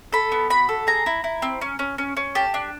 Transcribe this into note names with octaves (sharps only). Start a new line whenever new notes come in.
A4 B5
B3
F#4 B5
A4
G#4 A#5
E4
E4
C4
C#4
C#4
C#4
C#4
G4 A5
D4